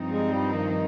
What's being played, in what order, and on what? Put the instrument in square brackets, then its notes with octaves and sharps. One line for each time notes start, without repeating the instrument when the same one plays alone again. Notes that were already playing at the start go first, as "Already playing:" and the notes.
Already playing: [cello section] G2 F3 C4 D#4
[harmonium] G#3
G3
D#3